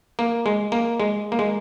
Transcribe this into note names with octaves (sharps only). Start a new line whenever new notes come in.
A#3
G#3
A#3
G#3
A#3
G#3